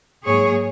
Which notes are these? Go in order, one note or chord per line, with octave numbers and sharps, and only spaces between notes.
G#2 F#3 A#3 G#4 C#5